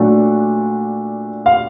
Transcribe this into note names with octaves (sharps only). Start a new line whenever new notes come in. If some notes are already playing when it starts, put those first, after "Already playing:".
Already playing: A#2 F#3 A3 D4 F#5
F5